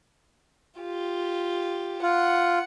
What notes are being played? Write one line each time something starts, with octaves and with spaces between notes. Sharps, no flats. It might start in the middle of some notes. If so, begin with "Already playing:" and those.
F4 G4
F4 F#5